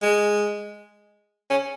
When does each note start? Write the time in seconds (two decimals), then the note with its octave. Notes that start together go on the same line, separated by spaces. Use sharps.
0.02 G#3
1.50 C#4